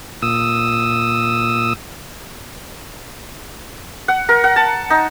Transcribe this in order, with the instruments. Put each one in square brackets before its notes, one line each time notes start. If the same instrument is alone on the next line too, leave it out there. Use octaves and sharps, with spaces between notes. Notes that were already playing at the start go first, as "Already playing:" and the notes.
[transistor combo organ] A#2 D#6 E6
[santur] F#5
A#4
F#5
A5
D#4